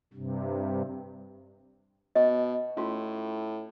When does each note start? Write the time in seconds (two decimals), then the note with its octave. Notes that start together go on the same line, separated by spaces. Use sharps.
0.14 G2 C3
2.15 B2 D#5
2.77 A2 C#4 F4 F#4